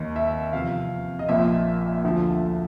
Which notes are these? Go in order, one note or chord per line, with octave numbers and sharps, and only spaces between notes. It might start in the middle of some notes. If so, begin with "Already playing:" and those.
Already playing: D#2 D#3
E5
E2 C3 F3 F5
D#5
A#1 A#2 F3 E5
D2 D3 F3